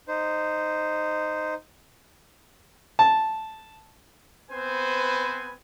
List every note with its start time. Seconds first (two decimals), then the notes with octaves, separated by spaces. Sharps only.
0.08 D#4 C5
2.99 A5
4.51 B3 C4 B4 C5 G#5